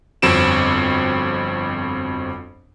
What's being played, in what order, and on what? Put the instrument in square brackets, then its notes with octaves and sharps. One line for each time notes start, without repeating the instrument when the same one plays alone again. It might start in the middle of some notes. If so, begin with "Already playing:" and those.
[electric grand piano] G1 F2 C4 F#4 D7 E7